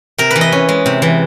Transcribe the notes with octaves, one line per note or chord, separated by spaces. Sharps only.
C3 A#4
B4
E3
D#5
C#4
G#3
C3
E3